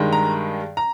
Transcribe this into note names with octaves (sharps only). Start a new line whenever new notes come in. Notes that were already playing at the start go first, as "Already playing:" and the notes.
Already playing: G2 D#3 G#3
A#5
A#5